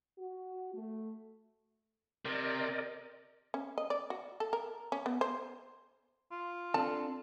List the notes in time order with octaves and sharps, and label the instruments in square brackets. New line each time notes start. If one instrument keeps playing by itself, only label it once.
[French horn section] F#4
A3
[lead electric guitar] C3 [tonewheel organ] A#4 D5 D#5
[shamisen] C#4
D#5
D5
F#4
A4
A#4
C#4
B3
C5
[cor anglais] F4
[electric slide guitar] C4 D4 A4 [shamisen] A5